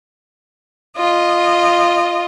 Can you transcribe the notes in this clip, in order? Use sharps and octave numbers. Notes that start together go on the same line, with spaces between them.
F4 D#5